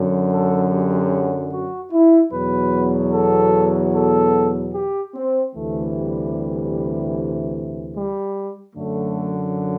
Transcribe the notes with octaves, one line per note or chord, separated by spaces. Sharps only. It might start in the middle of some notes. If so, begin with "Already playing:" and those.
Already playing: F#2 D3 F#3
A4
G4
F#4
E4
E2 B2 F#3 B4
A4
A4
G4
C4
D2 C3 E3 A3
G3
G3
F#2 D3 F#3 A3